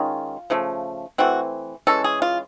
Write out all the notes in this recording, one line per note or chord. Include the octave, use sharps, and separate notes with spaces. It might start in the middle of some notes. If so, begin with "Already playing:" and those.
Already playing: D#3 G#3 C#4 F4
C#3 F3 A3
E3 A3 C4 F#4
E3 G#3 C#4 A4
G#4
F4